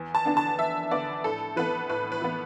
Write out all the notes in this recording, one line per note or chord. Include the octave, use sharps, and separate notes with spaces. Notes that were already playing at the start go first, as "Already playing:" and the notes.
Already playing: E2
A5
D3 B3 D4
A5
E2 E5
D3 B3 D4 D5
A2 A4
E3 B3 B4
A2 B4
B4
E3 B3